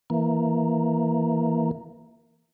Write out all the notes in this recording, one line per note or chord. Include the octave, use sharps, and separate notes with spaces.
E3 A#3